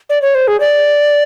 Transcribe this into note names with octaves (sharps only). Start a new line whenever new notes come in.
D5
C#5
C5
G#4
D5